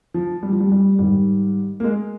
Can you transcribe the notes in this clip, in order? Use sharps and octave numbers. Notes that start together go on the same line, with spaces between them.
F3
G3
F3
G3
G3
G#2 D#3 G3
A#3
G#3